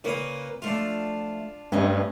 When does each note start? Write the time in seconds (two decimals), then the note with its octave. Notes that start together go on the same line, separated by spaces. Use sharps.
0.04 A#2 C#3 A#3 B4 C#5 D#6
0.62 F3 A3 D4 F4
1.72 G2 A3 C#4 D#5